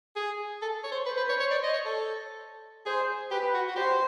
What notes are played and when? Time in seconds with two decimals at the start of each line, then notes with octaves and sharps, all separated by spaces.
0.16 G#4
0.62 A4
0.84 C#5
0.92 C5
1.06 B4 C5
1.17 B4
1.29 C#5
1.40 C#5
1.51 D5
1.63 D#5
1.74 C#5
1.85 A4
2.86 G#4 C5
3.31 G4 B4
3.54 F#4
3.69 F#4
3.76 G4 C5